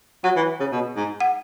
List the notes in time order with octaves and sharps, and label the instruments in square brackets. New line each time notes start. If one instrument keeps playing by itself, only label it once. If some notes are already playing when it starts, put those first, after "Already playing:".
[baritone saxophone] F#3 [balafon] F#5
[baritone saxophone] E3
C#3
B2
G#2
[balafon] F#5